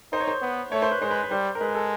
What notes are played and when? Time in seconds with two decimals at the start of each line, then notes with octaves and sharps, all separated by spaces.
0.13 D#4 C5
0.20 C#5
0.27 C5
0.42 B3
0.72 A3 C#5
0.82 C5
0.91 B4
1.01 G#3 C5
1.11 B4
1.23 B4
1.31 G3 C5
1.55 A#4
1.61 G#3 B4
1.75 A4